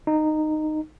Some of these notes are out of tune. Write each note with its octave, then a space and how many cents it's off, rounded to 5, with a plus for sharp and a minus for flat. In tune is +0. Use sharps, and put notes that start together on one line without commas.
D#4 -15